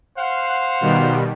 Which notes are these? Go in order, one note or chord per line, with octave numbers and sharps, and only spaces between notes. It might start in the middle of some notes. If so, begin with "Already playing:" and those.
C5 F5 F#5
B2 D#3 G3